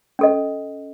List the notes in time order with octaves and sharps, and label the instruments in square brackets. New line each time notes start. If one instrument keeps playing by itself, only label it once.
[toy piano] C#4 A4 D#5